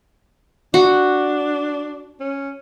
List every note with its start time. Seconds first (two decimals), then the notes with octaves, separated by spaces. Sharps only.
0.74 D4 F#4
2.20 C#4